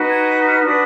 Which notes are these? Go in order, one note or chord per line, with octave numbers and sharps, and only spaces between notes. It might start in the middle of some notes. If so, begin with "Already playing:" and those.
Already playing: D#4 F#4 B4
G#6
F#6
F6
D4 F#4 B4 D#6